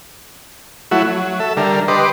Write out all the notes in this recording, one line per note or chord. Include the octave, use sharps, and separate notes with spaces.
F#3 A3 E4 F#4
F#3
A4 E5
D3 G3 A#4
G4 B4 D#5 C6 D6